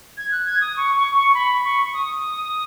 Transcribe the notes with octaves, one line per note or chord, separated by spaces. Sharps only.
G#6
F#6
G#6
D#6
C#6
C#6
C#6
B5
C#6
D#6